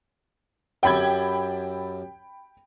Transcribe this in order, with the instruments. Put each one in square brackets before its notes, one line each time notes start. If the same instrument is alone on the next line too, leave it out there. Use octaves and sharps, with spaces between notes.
[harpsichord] F#2 G4 A4 [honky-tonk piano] G5 B5 G#6